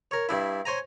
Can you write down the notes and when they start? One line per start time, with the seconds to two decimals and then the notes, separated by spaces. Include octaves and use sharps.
0.11 A#4 C#5
0.29 G2 D4 E4
0.65 C5 C#5 G#5 A#5